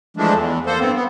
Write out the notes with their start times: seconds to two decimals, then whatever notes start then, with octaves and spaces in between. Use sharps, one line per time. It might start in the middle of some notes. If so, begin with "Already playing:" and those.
0.17 E3 F3 G#3 A3 D4
0.34 E2
0.66 A#3 A4 C5
0.79 G2 B3 C4
0.95 B3